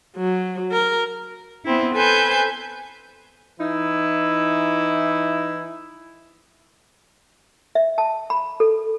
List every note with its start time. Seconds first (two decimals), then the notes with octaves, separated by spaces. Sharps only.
0.17 F#3
0.72 A#4
1.65 B3 C4 E4
1.95 A4 B4 C5 G#5 G6
3.60 E3 D#4 E4
7.75 E5
7.98 A5
8.30 B5
8.60 A4